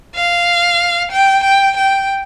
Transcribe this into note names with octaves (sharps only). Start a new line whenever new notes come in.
F5
G5
G5
G5